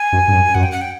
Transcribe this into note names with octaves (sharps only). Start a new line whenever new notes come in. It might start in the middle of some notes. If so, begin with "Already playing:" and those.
Already playing: G#5
F#2
G2
F#2
F#2 F#5
G5
F#5
G5